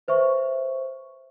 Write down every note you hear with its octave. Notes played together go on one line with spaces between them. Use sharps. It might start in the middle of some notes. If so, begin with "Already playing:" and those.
B4 C5 E5 C#6